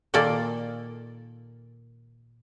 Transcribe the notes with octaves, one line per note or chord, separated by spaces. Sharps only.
A#2 D#3 A#3 A4 D5